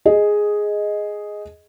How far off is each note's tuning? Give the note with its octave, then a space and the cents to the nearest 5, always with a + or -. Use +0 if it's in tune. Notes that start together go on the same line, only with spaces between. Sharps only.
G#4 +0 D#5 +0